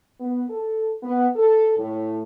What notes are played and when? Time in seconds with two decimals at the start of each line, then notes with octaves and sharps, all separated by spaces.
0.20 B3
0.49 A4
1.03 B3
1.36 A4
1.77 A2